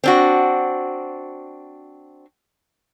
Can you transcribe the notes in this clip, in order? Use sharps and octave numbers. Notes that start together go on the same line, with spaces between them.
C4 D4 F#4